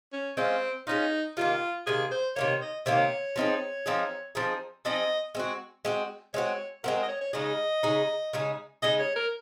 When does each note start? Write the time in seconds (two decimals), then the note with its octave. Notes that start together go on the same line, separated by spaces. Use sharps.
0.13 C#4
0.37 G#3 C4 C#4 F4
0.87 G#3 C#4 D#4 F4
1.37 C3 D#3 A#3 F4
1.86 C3 D#3 A#3 G#4
2.11 C5
2.36 C3 D#3 A#3 C#5
2.61 D#5
2.86 C3 D#3 A#3 C#5
3.36 F3 C4 D#4 G#4
3.86 F3 C4 D#4 G#4
4.35 F3 C4 D#4 G#4
4.85 F3 C4 D#4 G#4 D#5
5.35 G#3 C4 F#4
5.85 G#3 C4 F#4
6.34 G#3 C4 F#4 C#5
6.84 G#3 C4 F#4 A#4
6.96 A#4
7.03 D#5
7.08 C#5
7.21 C#5
7.33 C#3 G#3 D#4 G#4 D#5
7.83 C#3 G#3 D#4 G#4
8.33 C#3 G#3 D#4 G#4
8.82 C#3 G#3 D#4 G#4 D#5
9.00 C#5
9.16 A#4